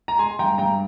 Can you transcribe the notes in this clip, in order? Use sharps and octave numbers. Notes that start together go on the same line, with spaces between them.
A#5
G#3 G#5 C6
G2 G5 A#5
G2 G5 A#5